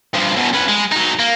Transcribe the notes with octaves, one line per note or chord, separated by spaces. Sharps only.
G2 F3
E2 B2
C#4 B4
G#3
F#3 D#4
A#3